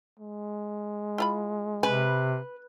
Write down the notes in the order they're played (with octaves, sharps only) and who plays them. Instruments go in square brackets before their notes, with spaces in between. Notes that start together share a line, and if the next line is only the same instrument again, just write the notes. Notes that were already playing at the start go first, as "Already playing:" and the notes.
[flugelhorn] G#3
[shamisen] E4 F4 B5
[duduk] C3 [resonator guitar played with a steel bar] B4 [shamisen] G#5